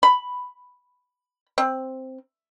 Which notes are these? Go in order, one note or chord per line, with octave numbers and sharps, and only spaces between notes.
B5
C4